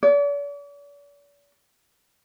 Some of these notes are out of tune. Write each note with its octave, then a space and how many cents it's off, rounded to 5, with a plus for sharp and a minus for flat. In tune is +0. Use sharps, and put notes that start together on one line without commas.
D5 -45